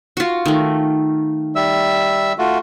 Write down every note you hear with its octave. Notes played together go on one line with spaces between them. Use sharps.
F4 F#4
D#3 A3
G3 E5 E6
A3 F4 F#4